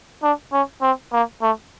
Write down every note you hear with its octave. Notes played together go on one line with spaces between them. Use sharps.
D4
C#4
C4
A#3
A3